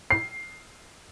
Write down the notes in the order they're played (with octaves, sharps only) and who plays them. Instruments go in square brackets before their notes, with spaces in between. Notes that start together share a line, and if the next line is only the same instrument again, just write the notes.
[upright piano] C7